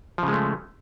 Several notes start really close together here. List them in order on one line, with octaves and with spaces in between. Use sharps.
F3 C#3 G#3 A3